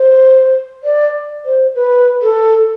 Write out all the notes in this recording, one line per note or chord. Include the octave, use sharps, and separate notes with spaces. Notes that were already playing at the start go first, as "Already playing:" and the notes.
Already playing: C5
D5
C5
B4
A4